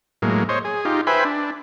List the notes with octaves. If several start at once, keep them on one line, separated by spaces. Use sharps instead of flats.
A2 F#3 G#3 A#3
C5 C#5 D#5
G#4
D#4 F4 G4
B4 C5 E5 G5 G#5 B5
D4